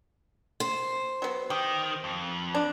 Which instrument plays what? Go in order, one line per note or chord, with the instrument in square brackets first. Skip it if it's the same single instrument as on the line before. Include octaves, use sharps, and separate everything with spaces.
[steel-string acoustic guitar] C5
[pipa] F#3 B3
[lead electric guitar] D#3 [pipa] G4
[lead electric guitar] F2
[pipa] D4